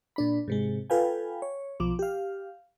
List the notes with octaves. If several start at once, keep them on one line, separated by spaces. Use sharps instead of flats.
A#2 D4 B5
G#2 C3 G#3
F4 A4 B4 F5 G5 G#5
C#5
B1 F3 D6
G4 F5